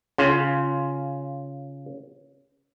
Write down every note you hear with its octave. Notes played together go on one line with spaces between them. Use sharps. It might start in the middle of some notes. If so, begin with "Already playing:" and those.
C#3 F4